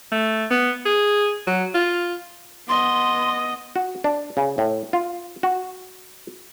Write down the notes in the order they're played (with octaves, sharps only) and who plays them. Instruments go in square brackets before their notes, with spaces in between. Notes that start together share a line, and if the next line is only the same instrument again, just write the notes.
[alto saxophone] A3
B3
G#4
F#3
F4
[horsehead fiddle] B3 D#5 [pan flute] C6
[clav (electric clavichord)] F#4
D4
C#3
A2
F4
F#4